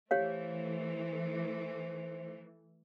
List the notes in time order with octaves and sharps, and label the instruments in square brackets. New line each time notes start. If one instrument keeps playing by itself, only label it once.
[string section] E3 A3 [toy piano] G4 C#5 F5 [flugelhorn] C5